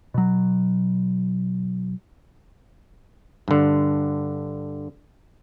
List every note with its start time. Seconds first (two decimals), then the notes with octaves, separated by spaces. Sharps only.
0.14 B2 F#3
3.48 G2 D3